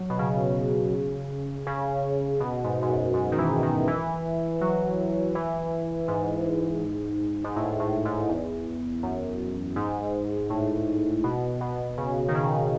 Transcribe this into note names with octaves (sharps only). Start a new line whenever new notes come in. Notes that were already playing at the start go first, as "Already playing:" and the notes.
Already playing: F#3
B2
C#3
C#3
B2
G#2
G#2
F#2
G#2
D#3
E3
D#3
E3
F#3
E3
G#2
G#2
A2
A2
G#2
E2
F#2
G#2
A2
B2
B2
C#3
D#3
C#3